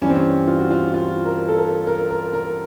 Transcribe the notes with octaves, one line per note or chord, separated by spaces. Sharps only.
G2 E3 G3 C#4
C4
C#4
F4
F#4
F4
F4
A#4
A4
A#4
A#4
A#4
A#4